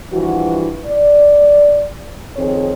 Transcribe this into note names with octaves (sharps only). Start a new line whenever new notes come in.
G2 E3 F3 F#4
D5
F2 D#3 C4 G#4 C#5